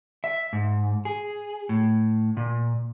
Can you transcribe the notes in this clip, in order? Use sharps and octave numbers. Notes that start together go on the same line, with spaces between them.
E5
G#2
G#4
A2
A#2